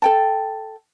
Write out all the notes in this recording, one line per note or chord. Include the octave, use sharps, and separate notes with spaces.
A4 G5 A5